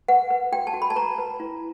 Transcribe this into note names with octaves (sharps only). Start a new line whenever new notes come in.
B4 F#5
B4
F#4 G5
A5
F#4
B5
A5
B4 A#5
B4
E4